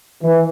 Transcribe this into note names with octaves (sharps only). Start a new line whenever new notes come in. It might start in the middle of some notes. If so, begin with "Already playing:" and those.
E3